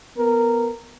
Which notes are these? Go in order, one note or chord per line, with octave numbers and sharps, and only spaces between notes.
B3 A#4